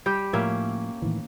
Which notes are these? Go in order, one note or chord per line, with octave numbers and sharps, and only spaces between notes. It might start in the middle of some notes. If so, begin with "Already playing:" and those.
G3 G4 G5
A2 F3 A#3 C#4 E5
A2 D#3 E3